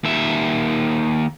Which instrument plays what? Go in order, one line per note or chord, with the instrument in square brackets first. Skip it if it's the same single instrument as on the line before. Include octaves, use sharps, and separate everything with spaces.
[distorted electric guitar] D#2 E5